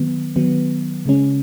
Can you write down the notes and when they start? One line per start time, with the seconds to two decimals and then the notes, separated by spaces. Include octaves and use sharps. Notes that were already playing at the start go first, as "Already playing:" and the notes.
Already playing: D#3 F#3 B3
0.36 D#3 F#3 B3
1.06 C#3 G#3 C#4